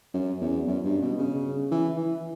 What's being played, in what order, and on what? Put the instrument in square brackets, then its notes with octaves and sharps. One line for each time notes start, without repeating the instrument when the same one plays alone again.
[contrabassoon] F#2
E2
F#2
G2
B2
C#3
E3
E3